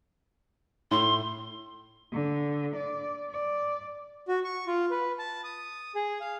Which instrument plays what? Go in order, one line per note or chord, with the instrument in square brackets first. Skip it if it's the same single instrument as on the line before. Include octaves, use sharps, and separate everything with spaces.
[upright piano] A2 [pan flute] C6
[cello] D3
D5
D5
[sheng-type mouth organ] F#4
C#6
F4
B4
A5
D#6
G#4
F5